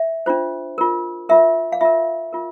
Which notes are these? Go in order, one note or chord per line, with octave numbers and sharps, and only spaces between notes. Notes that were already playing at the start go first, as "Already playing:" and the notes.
Already playing: E5
D4 F4 C5
F4 A#4
F4 A#4 E5
F5
F4 A#4 E5
F4 A#4